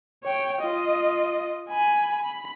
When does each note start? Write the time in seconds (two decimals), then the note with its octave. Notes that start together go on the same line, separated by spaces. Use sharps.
0.23 C#5 G5
0.61 F4 D#5
1.70 G#5 B5
2.23 B5